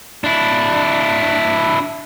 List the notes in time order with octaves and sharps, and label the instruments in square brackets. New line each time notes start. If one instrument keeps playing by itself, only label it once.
[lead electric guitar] D4 E4